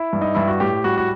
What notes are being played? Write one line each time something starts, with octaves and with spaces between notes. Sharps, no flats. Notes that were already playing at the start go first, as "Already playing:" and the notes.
Already playing: E4
G2
D#4
G2 E4
F#4
A2 G4
G3 F#4
F#4